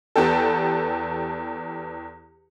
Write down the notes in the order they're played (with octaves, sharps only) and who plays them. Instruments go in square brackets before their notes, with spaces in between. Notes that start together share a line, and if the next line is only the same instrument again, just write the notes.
[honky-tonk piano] E2 B3 G4 A4